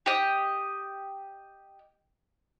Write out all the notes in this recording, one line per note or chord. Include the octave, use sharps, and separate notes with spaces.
G4 D#5